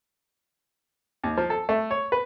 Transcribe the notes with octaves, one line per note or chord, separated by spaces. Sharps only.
D#2
F3
A4
A3
C#5
B4